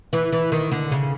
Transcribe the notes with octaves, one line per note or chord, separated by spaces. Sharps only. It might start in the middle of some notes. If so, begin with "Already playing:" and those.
E3
E3
D#3
D3
C#3